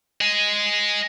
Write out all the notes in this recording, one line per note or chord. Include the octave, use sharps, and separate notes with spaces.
D#5 G#5